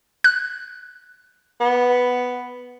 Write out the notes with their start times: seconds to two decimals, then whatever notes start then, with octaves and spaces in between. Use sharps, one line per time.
0.24 F#6
1.60 B3